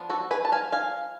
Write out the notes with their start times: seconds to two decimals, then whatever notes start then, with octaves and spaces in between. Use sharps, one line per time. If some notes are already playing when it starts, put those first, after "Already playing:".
Already playing: F3 B3 D4
0.10 F#4 A4
0.31 G#4 B4
0.45 A5
0.52 F5 G#5
0.72 F5 G#5